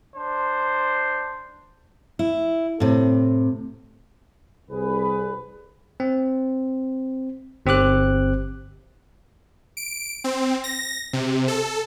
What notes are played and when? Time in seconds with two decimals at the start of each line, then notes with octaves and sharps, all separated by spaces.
0.16 D4 C5
2.19 E4
2.80 A2 C3
4.70 C2 G#4 B4
6.00 C4
7.66 G1 C4 G4 D6 F#6
9.77 D7
10.24 C4
10.64 A#6
11.13 C3
11.48 A4